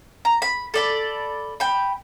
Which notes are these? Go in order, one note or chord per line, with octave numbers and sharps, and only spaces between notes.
A#5
B5
A4 D5 B5
G5 B5